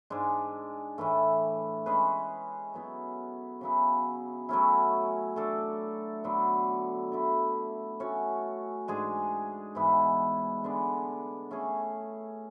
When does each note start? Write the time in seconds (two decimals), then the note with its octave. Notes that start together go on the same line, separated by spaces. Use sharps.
0.10 G#2 G#3 D4
0.98 A2 E3 A3
1.86 G#3 C#4 G#4 B4
2.74 F#3 B3 E4
3.61 C#3 F#3 B3 E4
4.49 F#3 A3 C#4 E4
5.36 A3 D4 A4
6.24 D3 F#3 B3
7.12 D3 A3 E4
8.00 A3 C#4 F#4 C#5
8.88 G#2 G#3 D4 G#4
9.75 G#2 E3 B3 E4
10.64 D3 G#3 B3 D4
11.51 A3 C#4 G#4 C#5